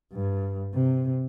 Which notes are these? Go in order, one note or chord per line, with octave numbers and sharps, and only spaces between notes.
G2
C3